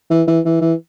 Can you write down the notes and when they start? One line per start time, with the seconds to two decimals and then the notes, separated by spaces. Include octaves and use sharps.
0.10 E3
0.28 E3
0.45 E3
0.61 E3